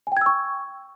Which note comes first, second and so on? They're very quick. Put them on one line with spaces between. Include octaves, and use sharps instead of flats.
G#5 G5 G#6 E6 C#6